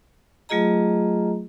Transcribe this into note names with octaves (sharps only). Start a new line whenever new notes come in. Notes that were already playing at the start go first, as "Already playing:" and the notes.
F#3 A3 F4 G#4 D#5 A#5